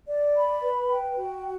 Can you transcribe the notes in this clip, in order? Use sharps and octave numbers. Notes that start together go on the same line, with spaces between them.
D5
B5
B4
G5
F#4